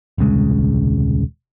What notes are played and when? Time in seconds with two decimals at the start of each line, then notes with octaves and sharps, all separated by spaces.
0.18 D#1 C2 C#3 G#3